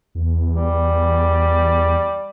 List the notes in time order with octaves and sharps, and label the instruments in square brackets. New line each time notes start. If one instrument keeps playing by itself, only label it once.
[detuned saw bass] E2
[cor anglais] G3